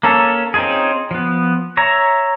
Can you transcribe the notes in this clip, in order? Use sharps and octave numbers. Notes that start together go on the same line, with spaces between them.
A#3 C#4 A4
C4 C#4 D#4 F4 G#4
F3 B3
C#5 E5 A#5